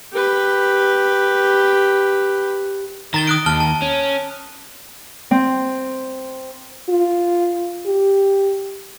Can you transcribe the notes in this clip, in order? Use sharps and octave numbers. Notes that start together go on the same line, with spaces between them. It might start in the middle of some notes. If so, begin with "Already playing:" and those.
G4 B4
D#3 A#5 A6 G7
D#6 F#6 D7
D#2 A5 F6 G7
A5
C#4
C4
F4
G4